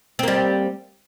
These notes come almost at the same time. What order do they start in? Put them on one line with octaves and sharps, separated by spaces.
C4 A#3 G3